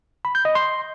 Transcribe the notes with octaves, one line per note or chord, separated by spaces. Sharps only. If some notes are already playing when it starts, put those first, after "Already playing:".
B5
G6
D#5
C6